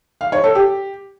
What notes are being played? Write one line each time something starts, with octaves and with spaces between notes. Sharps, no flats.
F5
C#5
A4
G4